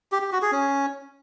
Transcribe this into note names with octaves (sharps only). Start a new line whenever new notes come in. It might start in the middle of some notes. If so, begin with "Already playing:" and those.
G4
G4
F#4
G#4
C#4